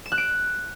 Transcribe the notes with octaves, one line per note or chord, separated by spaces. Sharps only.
E7
F#6
D7